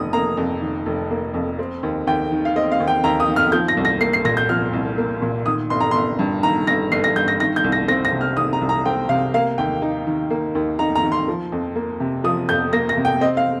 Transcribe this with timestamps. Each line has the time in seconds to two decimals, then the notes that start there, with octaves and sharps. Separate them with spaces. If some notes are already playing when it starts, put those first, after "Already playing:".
Already playing: F1 D#3 D#6
0.13 A#3 A#5
0.37 F2
0.62 D#3
0.86 F1
1.11 A#3
1.34 F2
1.59 C4
1.83 D#2
2.07 D#2 G5
2.32 D#3
2.45 F5
2.56 C4 D#5
2.72 F5
2.80 D#2
2.88 G5
3.04 D#2 A#5
3.20 D#6
3.28 D#3
3.36 F6
3.52 F3 G6
3.68 A#6
3.77 C2
3.85 A#6
4.01 A#3 C7
4.13 C7
4.25 A#2 A#6
4.37 G6
4.49 F3 F6
4.73 C2
4.98 A#3
5.22 A#2
5.46 D#3 D#6
5.70 G1 C6
5.81 A#5
5.91 G1 C6
6.19 G2
6.43 D#3 A#5
6.67 G1 A#6
6.92 G1 C7
7.04 A#6
7.16 G2 G6
7.28 A#6
7.40 D#3 A#6
7.56 G6
7.64 C2
7.72 A#6
7.88 C4 A#6
8.05 A#6
8.12 C3
8.21 F6
8.36 D#3 D#6
8.53 A#5
8.61 C2
8.69 A#5
8.85 C4 G5
9.09 C3 F5
9.34 A#3 F5
9.58 D#2 G5
9.82 D#4
10.07 D#3
10.30 A#3
10.55 D#2
10.79 D#4 A#5
10.95 A#5
11.03 D#3
11.12 C6
11.28 F3
11.52 F2
11.76 A#3
12.00 C3
12.24 F3 D#6
12.49 F2 G6
12.73 A#3 A#6
12.89 A#6
12.97 C3
13.05 G5
13.21 C4 D#5
13.37 F5